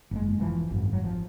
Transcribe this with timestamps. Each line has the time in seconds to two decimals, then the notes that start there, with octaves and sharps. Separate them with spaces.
0.11 F#1 C#3 G#3
0.38 F1 E3 F3
0.71 G#1 F#2
0.93 F#3
1.04 F3